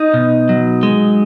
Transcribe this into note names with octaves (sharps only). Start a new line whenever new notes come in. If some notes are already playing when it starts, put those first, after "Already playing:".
Already playing: D#4 D#5
B2
F#3
G#3